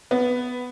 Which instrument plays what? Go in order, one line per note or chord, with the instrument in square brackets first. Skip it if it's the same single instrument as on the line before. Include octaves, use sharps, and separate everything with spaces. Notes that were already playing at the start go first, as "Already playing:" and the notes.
[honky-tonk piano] B3